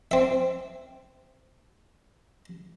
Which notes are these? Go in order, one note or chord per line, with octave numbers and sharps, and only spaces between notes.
C4 E5